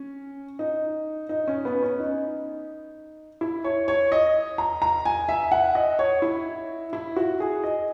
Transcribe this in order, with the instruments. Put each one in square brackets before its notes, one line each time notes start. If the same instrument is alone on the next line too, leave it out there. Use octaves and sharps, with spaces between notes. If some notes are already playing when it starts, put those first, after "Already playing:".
Already playing: [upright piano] C#4
D#4
D#4
C#4
B3
C#4
D#4
E4
C#5
C#5
D#5
A#5
A#5
G#5
E5
F#5
D#5
C#5
E4
E4
F#4
G#4
D#5